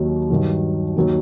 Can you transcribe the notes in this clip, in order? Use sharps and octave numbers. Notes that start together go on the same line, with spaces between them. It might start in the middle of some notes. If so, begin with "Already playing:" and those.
Already playing: D#2 D#3 F#3
G2 D#3 F#3
D#2 D#3 F#3